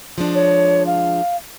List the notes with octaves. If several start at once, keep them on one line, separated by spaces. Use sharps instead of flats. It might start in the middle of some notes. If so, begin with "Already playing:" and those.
F3 G#3 D4
C#5
F5